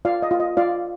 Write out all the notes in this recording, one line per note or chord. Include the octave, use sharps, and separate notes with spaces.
F4 D5 F5
D#5
F4
D#5
F4 D5 F5